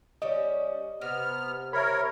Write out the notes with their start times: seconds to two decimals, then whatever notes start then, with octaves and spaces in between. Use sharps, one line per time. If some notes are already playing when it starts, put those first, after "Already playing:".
0.22 G3 C#4 D#5
1.02 C3 B3 F6
1.73 A#4 C#5 E5 B5